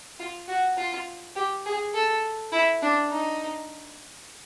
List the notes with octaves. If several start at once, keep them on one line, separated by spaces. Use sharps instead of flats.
F4
F#4
F4
G4
G#4
A4
E4
D4
D#4